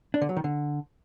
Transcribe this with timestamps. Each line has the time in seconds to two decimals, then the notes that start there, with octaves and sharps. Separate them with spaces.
0.14 D4
0.22 D3
0.29 F#3
0.37 D#3
0.44 D3